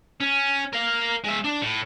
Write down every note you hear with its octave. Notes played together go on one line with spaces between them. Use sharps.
C#4
A#4 F5
G#3 E5
D4
A2